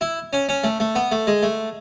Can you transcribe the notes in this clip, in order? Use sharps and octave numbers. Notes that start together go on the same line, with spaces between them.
E4
C#4
C#4
A3
A3
B3
A3
G#3
A3